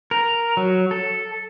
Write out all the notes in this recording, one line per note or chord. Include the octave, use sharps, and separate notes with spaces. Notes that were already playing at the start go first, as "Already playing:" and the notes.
A#4
F#3
A4